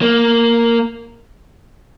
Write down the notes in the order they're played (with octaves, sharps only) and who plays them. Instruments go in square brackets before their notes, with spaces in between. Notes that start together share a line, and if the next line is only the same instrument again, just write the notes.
[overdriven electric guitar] A#3